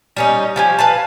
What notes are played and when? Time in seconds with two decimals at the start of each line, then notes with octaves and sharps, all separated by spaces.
0.16 G3 C#4 D#4
0.56 F3 G4 G#5
0.78 B4 F5 A5